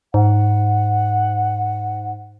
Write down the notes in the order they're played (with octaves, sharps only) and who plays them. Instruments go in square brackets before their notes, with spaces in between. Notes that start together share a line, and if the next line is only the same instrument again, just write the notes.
[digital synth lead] G#2 [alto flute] F#5